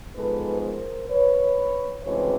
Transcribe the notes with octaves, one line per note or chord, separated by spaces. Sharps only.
G#2 F3 G#3 B3 A4 B4
A#4 C5
B4 C#5
D2 C#3 E3 G#3 C4 B4 C#5